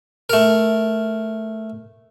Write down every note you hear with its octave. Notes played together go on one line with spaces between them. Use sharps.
A3 A#4